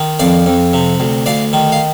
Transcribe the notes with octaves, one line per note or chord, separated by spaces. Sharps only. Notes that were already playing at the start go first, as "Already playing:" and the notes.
Already playing: D#3
F2 D5 F5
F2
C3
D2
D2 D5 F5
D#3
F5